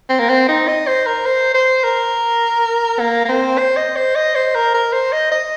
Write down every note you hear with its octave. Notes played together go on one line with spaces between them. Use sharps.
C4
A#3
C4
D#4
D#5
C5
A#4
C5
C5
A#4
A#3
A#3
C4
C5
D#5
C5
D#5
C5
A#4
A#4
C5
D#5
D#5